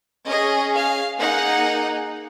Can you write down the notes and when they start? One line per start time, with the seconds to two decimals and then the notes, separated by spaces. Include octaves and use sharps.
0.27 C#4 G#4 D#5
0.73 F5
1.19 A#3 D#4 G#4 F#5